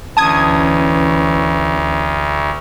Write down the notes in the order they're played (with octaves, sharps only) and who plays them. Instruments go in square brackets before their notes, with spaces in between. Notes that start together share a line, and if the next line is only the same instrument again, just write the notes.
[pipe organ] D2 [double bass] E3 C#4 [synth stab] A5 D#6 G#6